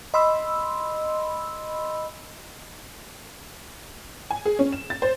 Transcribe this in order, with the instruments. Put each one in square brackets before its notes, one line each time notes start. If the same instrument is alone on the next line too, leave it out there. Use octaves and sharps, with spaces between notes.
[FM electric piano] D#5 B5 C6 E6
[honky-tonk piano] G#5
G#4
C#4
E7
A6
C5